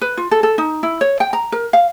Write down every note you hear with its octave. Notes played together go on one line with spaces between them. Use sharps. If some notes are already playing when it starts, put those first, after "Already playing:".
B4
F4
A4
A4
D#4
E4
C#5
G5
A#5
A#4
F5